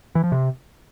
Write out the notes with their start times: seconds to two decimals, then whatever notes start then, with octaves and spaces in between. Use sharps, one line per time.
0.15 E3
0.24 F3
0.32 C3